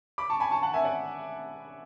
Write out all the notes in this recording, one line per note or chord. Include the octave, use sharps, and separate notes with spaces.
B5 D6
A5 C#6
G#5 B5
A5 C#6
F#5 A5
E5 G#5
D5 F#5